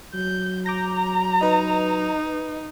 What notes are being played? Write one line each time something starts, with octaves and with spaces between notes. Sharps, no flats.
F#3 G6
A#5 D6 G6 A#6
D#4 B4 D#5